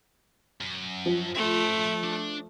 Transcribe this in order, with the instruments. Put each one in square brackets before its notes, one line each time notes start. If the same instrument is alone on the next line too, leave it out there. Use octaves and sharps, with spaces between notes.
[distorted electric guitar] F#2
[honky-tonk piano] F3
[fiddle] A3 [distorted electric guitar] E5 C6
[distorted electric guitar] D4